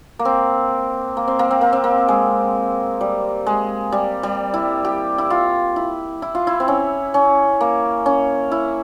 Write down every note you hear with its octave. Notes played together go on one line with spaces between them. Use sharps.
A#3
C4
A#3
C4
A#3
C4
A#3
C4
A#3
G#3
G3
G#3
G3
G3
E4
G4
E4
F4
E4
E4
F4
E4
C4
C#4
C#4
A#3
C#4
E4